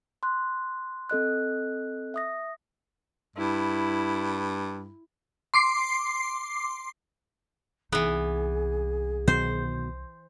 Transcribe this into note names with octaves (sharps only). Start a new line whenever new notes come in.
C6 F#6
C4 A4 D#5 F#6
E5 D#6 A#6
G2 E4
C6 D6 C7
C2 E3 B3 D#4 G#4
B2 D#3 F#3 C5